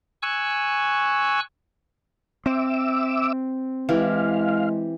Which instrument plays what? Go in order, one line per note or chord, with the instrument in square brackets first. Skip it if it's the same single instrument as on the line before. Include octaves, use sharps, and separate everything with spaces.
[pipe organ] G#5 C#6 E6 F#6
[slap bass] C4 [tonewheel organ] E5 D6 E6
[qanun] E3 G4 [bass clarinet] G#3 [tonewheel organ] F5